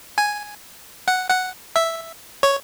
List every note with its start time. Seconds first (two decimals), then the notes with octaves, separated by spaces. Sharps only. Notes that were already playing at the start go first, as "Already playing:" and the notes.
0.18 G#5
1.08 F#5
1.30 F#5
1.76 E5
2.43 C#5